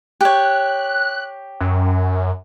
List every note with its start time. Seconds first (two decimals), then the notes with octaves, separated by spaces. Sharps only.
0.21 G4 C#5 F#6
1.61 F#2